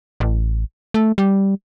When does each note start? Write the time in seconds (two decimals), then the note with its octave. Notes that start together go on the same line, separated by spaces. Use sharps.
0.20 A1
0.94 A3
1.18 G3